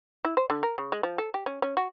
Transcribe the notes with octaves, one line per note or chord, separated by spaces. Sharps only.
E4
C5
D3
A#4
C#3
G#3
F3
A4
G4
C#4
C#4
F#4